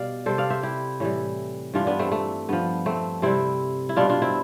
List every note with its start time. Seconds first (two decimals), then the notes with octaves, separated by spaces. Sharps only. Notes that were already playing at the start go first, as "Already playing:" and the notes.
Already playing: B2 G3 D5 F5
0.26 C3 G3 A4 C5
0.38 D5 F5
0.50 C5 E5
0.63 E4 G4
1.00 A2 E3 G3
1.74 G2 E3 G3 D4 F4
1.87 B3 D4
1.99 A3 C4
2.12 A3
2.49 G2 F3 B3
2.86 A3 C4
3.22 C3 G3 C4 E4
3.89 E4
3.96 B2 G3 D4 F4
4.10 D4 F4
4.22 C4 E4